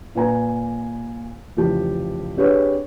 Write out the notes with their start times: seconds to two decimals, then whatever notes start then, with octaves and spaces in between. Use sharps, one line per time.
0.15 A#2 B4 G#5 A#5
1.57 F1 C#3 E3 F3 G4 A5
2.37 C4 D4 G4 G#4 B4 C#5